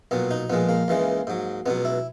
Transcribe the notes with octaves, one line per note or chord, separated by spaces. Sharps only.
B1 A#2 F#3 B3
D#4
A#1 A#2 G#3 B3
A#3
C#2 C#3 E3 G#3
G#2 F#3
C#2 B2 F#3 B3
E4